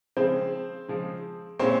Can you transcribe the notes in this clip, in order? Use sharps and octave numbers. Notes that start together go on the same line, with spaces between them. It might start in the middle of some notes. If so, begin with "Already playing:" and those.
C#3 F3 G#3 C4 C5
C#3 F3 G#3
A#2 G#3 C4 C#4 C5